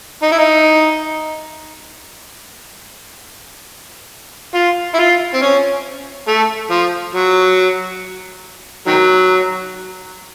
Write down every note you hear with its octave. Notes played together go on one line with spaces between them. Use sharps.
D#4
E4
D#4
F4
E4
F4
C4
C#4
A3
F3
F#3
D#3 F#3